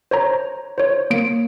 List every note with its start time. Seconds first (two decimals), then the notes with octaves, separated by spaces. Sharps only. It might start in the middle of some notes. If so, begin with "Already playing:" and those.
0.11 C5 C#5 A#5
0.78 C5 C#5
1.10 A#3 D7